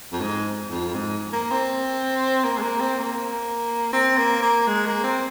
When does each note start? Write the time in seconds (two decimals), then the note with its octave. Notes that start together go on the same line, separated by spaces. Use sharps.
0.12 F2
0.20 G#2
0.70 F2
0.94 G#2
1.33 A#3
1.51 C4
2.44 A#3
2.58 G#3
2.62 A#3
2.80 C4
2.99 A#3
3.93 C4
4.18 A#3
4.42 A#3
4.67 G#3
4.86 A#3
5.04 C4